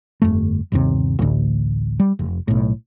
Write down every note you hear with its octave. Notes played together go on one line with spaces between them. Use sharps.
G1 F2 A3
G1 D#2 C3
A1 D2
G3
F1
B1 A2